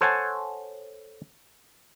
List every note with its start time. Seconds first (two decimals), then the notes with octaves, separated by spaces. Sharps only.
0.01 A4 C5 C#5 F#5 G#5 A5